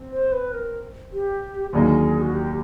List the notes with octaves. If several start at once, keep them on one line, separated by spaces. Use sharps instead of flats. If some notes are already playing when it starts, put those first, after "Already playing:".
Already playing: C4
C5
B4
A#4
G4
D#2 D3 F#3 A#3 D#4 G#4
F#4
G4